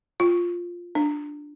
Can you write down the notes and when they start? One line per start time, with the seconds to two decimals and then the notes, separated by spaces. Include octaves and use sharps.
0.20 F4
0.95 D4